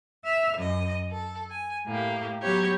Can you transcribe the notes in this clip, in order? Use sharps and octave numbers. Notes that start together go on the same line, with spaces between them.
E5 F6
F#2 D#5
A4
G#5
A2 A#3 G4
F#3 B3 G4 C#5 G#6